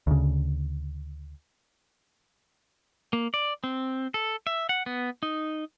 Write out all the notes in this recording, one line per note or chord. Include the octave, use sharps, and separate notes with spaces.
D2 C#3
A#3
D5
C4
A4
E5
F#5
B3
D#4